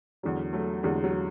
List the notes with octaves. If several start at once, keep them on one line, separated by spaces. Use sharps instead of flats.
E2 D3 F#3 G#3
F#3 A3
E2 D3 F#3 G#3
F#3